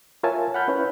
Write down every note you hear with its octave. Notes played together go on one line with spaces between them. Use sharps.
F4 A#4 C#5 E5 G#5 A5
F#5 A5 B5 F6 G6
C#4 E4 B4 C#5